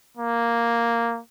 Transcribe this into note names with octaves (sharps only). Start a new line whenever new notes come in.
A#3